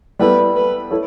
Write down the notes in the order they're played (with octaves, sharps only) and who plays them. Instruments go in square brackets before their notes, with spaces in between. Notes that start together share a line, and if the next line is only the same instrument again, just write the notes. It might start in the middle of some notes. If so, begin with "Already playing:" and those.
[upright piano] G3 B3 E4 A4 [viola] B4
[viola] B4
[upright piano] E4 A4 C#5